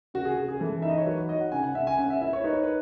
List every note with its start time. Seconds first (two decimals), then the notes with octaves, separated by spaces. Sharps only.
0.14 C#3 F#4
0.25 G#4
0.37 C#3 G#4
0.48 G#4
0.60 E3 A4
0.82 D#4 E5
0.90 D#5
0.98 C#5
1.06 F#3 B4
1.18 C#5
1.29 D#4 D#5
1.41 F#5
1.52 C#3 G#5
1.64 F#5
1.75 C#3 E5
1.87 G#5
1.98 C#4 F#5
2.10 E5
2.21 E4 E5
2.33 C#5
2.44 D#4 B4
2.54 C#5
2.63 B4